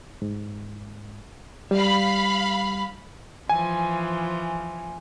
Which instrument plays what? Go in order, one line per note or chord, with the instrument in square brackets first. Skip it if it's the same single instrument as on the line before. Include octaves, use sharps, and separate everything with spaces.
[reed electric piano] G#2
[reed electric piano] G3 [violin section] F5 B5
[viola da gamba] E3 F3 [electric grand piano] G#5